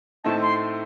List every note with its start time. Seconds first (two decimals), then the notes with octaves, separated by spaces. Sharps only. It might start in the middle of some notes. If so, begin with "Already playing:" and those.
0.24 A2 A3 C4 D#4 A5
0.42 C6